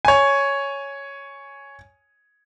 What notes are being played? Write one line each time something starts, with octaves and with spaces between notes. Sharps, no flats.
C#5 G#5